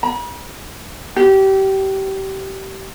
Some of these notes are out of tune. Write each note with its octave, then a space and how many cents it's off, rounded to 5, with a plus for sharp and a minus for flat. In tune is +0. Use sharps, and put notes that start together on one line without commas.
B5 -45
G4 -25